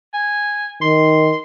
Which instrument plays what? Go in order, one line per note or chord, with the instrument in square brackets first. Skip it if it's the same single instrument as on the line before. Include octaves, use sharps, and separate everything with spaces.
[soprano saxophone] G#5
[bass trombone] D#3 [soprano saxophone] C6